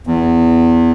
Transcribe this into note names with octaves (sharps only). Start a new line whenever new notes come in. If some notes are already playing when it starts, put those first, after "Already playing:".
E2